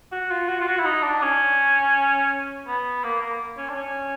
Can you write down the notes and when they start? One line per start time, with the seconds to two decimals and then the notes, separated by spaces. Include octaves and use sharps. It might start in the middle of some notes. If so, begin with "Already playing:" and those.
0.12 F#4
0.31 F4
0.49 F#4
0.61 F4
0.68 F#4
0.79 E4
0.85 D#4
1.04 D4
1.22 C#4
2.68 B3
3.04 A#3
3.22 A#3
3.57 C#4
3.69 D4
3.76 C#4